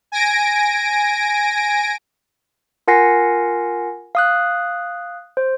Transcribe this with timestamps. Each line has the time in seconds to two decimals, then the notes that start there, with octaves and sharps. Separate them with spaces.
0.12 G#5 A#6 D7
2.88 F4 A#4 F#5 G#5 A#6 C7
4.15 F5 D#6 F#6
5.37 C5